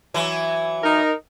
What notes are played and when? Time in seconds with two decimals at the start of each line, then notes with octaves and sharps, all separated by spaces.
0.14 E3 F#3
0.83 D#4 A#4